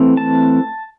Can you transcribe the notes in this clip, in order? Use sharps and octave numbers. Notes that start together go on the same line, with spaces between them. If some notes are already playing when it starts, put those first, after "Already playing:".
Already playing: E3 A3 C4
A5